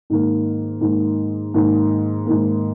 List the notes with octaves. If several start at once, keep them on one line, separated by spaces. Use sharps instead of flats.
G#2 D#3 A#3
G#2 D#3 A#3
G#2 D#3 A#3
G#2 D#3 A#3